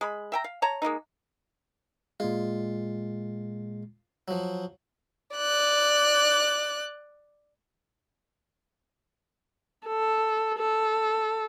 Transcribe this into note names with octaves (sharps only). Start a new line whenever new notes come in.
G#3 B5
E5 G5 A#5
F5
C#5 A5 A#5
G#3 A#3 B3 D#4
A#2 G#3 F4
F3 F#3
D5 F#6
A4
A4